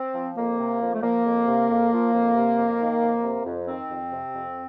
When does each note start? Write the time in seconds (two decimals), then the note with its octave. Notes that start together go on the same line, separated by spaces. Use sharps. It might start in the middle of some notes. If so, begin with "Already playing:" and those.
Already playing: C4
0.15 F3
0.37 F2 A#3
0.58 C3
0.81 F2
0.94 A3
1.02 F3 A#3
1.25 F2
1.46 C3
1.69 F2
1.91 F3
2.13 F2
2.35 C3
2.57 F2
2.79 D#3
3.02 F2
3.23 C3
3.45 F2
3.67 D#3 C4
3.89 F2
4.12 C3
4.34 F2